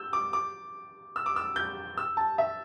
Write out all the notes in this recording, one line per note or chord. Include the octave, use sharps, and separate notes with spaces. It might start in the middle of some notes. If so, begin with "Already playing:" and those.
Already playing: E6 G6
D6
D6
E6
D6
E6
G6
E6
A5
E5